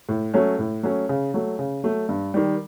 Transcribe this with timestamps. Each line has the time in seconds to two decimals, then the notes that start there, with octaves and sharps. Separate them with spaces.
0.09 A2
0.34 F#3 A3 C#4
0.59 A2
0.83 F#3 A3 C#4
1.09 C#3
1.34 F#3 A3
1.59 C#3
1.84 F#3 A3
2.09 G2
2.34 D#3 G3